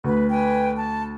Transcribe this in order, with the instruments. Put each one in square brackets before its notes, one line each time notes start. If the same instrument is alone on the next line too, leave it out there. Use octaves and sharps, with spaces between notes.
[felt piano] D2 [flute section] B4
[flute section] B4 G5 G#5
A5